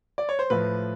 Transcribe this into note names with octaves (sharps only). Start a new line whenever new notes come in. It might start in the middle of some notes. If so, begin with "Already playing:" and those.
D5
C#5
C5
A2 F3 B4